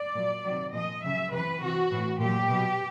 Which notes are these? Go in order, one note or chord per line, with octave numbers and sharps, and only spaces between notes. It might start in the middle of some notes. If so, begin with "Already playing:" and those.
Already playing: D5
A#2 F#3
C3 D#3 F#3
A#2 F3 D#5
C#3 F#3 E5
C3 E3 B4
C3 E3 F#4
A2 E3
A#2 F#3 G4
B2 F#3